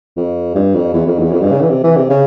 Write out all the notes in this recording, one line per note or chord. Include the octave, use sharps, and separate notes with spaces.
F2
G2
F2
E2
F2
E2
F2
G2
C#3
E3
C3
E3
C3
C#3